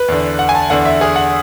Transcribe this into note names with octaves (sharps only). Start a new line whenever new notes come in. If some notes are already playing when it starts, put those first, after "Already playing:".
Already playing: B4
E2 D3
F#5
G#5
A5
E2 D3 F#5
E5
G#4
F#5